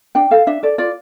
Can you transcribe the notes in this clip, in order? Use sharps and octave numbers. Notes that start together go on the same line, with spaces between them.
D4 G5
A4 F5
D4 E5
A4 D5
F4 D5